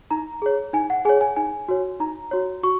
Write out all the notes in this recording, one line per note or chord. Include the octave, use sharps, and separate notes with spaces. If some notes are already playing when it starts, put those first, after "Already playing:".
D#4 A#5
G#4 C#5
D#4 G#5
F#5
G#4 C#5 G#5
G#5
D#4 G#5
F#4 C#5
D#4 A#5
F#4 C#5
F#4 C#6